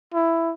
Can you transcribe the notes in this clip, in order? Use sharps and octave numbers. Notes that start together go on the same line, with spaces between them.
E4